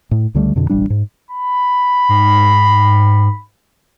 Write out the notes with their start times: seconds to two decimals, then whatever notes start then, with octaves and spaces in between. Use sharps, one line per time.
0.11 A2
0.35 C#2 D3 G3 A3
0.56 F2 B2 D3
0.70 E1 A1 G3 D4
0.90 G#2
1.31 B5
2.09 G#2